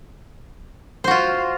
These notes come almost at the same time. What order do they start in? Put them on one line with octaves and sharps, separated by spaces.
C5 F#4 F4